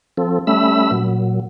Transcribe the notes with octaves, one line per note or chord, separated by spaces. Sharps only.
F3 C4 A4
G3 A3 C#4 E5 B5 E6
A#2 F#3